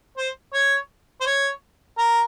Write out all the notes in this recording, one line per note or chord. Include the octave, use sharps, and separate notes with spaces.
C5
C#5
C5
C#5
A#4